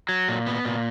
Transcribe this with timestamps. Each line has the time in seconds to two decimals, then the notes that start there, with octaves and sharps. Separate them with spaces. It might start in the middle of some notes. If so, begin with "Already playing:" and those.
0.09 F#3
0.28 A#2
0.47 B3
0.65 A#2